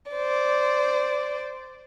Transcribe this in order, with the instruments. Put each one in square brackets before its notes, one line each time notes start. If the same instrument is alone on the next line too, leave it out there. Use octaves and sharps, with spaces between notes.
[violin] C5 D5